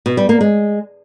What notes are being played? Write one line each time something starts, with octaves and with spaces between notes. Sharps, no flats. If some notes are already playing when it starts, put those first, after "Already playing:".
B2
G3
A#3
G#3